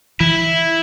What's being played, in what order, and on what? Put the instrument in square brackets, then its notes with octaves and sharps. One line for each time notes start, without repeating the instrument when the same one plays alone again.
[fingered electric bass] E3 [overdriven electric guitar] E4